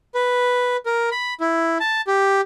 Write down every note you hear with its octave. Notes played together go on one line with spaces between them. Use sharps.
B4
A#4
B5
E4
A5
G4